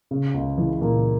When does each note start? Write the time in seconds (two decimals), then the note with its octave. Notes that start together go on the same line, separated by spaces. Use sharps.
0.11 C#3
0.34 C#2
0.58 E3
0.81 A#2 E3 A#3